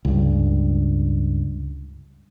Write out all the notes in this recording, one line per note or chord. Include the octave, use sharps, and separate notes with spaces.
C#2 G2